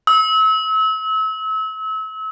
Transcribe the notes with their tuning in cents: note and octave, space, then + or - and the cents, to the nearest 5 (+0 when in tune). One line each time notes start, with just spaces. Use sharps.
E6 -35